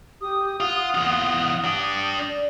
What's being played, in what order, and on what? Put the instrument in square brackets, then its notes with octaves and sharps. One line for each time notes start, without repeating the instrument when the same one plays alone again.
[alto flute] G4 [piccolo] D#6
[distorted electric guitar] F4 [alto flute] F#5
[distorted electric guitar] E2 F4
D4 G4
[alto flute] D5